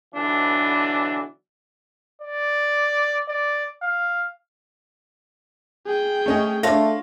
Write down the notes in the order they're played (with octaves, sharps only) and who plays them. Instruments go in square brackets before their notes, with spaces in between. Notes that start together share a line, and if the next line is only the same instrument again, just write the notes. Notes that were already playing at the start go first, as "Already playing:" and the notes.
[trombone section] B1 D3 E3 D4
[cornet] D5
D5
F5
[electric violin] G#4 G5
[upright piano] A3 C#4 D#5
[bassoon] A3 [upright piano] D4 A#6 [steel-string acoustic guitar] F4 C#5 F5